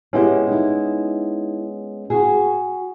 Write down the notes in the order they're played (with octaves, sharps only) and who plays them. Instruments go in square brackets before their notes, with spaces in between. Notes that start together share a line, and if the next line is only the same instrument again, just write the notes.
[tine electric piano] G#3 B3 C#4 [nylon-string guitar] E4 G4
[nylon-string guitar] D#4 E4
F#4 G#4